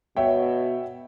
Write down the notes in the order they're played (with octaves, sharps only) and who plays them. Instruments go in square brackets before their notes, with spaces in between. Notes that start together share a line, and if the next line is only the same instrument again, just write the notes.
[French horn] B2 [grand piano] C#5 E5 G5